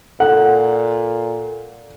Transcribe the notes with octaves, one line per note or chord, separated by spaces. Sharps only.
A#2 A4 F#5